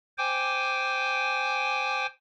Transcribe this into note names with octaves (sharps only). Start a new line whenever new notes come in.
C5 G5 G#5 D6